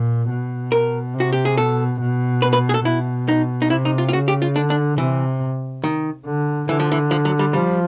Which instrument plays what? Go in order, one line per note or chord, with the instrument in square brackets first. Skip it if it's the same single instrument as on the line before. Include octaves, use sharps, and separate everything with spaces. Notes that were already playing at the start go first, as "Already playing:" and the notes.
Already playing: [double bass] A#2
B2
[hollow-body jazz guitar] A#4
[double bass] C3
[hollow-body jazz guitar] F#4
G4
G#4
[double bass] B2 [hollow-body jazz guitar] A4
[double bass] B2
[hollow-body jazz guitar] B4
B4
G#4
A4
[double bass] B2 [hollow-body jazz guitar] E4
[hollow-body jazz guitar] D#4
D#4
[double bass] C3 [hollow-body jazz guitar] E4
[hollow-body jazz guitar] D#4
F4
F4
[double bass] C#3 [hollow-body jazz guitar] F#4
[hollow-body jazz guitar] G4
F4
[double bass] D3 [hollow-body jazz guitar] D4
[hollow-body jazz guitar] D4
[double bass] C3 [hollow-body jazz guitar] E3
[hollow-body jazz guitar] D#3
[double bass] D3
[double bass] D3 [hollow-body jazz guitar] E3
[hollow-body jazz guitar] F3
E3
F3
F#3
G3
[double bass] F3 [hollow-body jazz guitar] G3